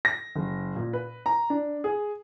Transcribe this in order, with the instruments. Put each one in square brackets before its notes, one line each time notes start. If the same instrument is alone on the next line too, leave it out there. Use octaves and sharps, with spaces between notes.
[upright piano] A#6
F#1
A#2
B4
A#5
D4
G#4